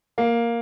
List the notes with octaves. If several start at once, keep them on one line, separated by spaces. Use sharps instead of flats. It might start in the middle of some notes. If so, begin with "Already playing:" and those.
A#3